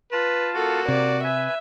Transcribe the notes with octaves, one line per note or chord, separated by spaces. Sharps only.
F4 B4 A5
A#3 F#4 A4
C3 D5
B4 E5 G#5